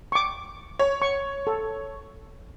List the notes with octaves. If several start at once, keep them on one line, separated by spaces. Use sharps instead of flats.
C#6 D6
C#5
C#6
A4